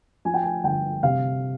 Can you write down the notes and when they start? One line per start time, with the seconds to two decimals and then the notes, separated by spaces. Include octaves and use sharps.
0.25 F3 G#5
0.34 G5
0.43 G#5
0.64 G1 G5
1.03 C3 F5